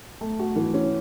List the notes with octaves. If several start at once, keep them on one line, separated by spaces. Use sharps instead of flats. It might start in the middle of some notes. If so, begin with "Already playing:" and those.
A3
F#4
E3
C#4